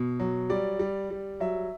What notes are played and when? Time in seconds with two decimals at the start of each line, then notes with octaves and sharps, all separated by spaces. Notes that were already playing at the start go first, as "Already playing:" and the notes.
Already playing: B2
0.20 F#3
0.50 G3 D5
0.79 G3
1.10 G3
1.40 F#3 E5